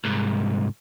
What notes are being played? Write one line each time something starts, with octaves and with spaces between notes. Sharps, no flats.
C2 G#2